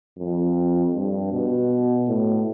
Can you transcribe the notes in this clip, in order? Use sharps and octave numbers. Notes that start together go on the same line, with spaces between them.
F2
G2
B2
A2